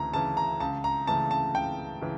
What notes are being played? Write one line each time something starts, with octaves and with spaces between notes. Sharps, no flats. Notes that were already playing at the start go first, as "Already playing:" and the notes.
Already playing: D2 C#3 E3 A#5
C#3 E3 A5
A#5
C#2 A5
A#5
C#3 E3 A3 A5
A5
C#2 G5
C#3 E3